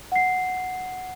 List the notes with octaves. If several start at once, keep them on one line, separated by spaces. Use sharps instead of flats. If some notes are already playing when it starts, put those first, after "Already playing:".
F#5 C7